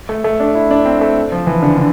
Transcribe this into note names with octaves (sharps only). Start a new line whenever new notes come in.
A3
A3
D4
E4
D4
C4
A3
F3
E3
D3
D3